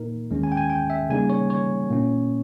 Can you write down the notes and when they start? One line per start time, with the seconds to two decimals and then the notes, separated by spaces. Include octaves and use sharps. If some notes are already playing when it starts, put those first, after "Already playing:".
Already playing: A#2 A#3 D#4 A#4
0.31 D#2 D#3 G#3 C#4
0.44 G#5
0.52 G5
0.57 G#5
0.70 G5
0.90 E5
1.09 C#3 G3 A#3 D#4 G#5
1.30 C#5
1.50 C#5
1.90 A#2 A#3 C#4